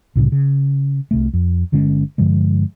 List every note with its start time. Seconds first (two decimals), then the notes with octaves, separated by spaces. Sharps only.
0.16 C2 A2 C#3 G3
0.32 C#3
1.11 C2 C3 A3
1.34 F2
1.72 G1 D3 G#3 C#4
2.18 G2 D3 F3 G#3